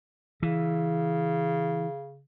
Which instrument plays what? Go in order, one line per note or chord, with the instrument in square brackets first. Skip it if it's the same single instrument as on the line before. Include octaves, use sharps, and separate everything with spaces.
[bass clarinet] C#3 [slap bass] E3